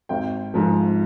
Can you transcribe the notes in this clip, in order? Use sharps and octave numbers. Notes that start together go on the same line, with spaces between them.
G#1 G5
G#2 F3